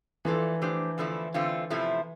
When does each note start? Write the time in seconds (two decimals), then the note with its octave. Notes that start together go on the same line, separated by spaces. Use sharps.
0.25 E3 F3 A3 D4 F4 A4
0.62 F3 A3 D4 G4 C5
0.98 E2 D3 F3 A3 E4
1.34 E2 D3 A3 C4 F4
1.70 E2 C3 F3 A3 E4